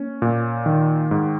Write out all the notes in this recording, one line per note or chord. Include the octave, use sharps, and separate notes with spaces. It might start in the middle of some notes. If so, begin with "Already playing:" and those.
Already playing: A#3 C#4
A#2
D#3
G#2